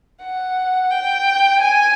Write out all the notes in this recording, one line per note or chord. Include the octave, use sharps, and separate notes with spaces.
F#5
G5
G#5